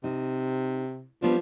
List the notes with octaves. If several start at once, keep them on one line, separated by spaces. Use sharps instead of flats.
C3 D#4
F3 G3 B3 D4